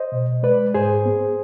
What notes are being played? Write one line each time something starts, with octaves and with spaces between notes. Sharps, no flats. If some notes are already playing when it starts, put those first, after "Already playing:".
Already playing: C5 D#5
B2
G#3 B4 D5
G#2 G#4 C5
B3